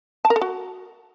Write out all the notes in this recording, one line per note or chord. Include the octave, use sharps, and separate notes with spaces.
A5
A#4
A4
F#4